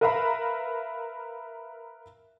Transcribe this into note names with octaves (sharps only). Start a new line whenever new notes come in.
A#4 B4 E5 F5 A#5 B5